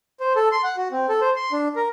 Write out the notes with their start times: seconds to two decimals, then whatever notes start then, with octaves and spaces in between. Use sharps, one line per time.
0.20 C5
0.36 A4
0.52 C6
0.64 F#5
0.77 F#4
0.92 C4
1.09 A4
1.21 C5
1.36 C6
1.52 D4
1.76 A#4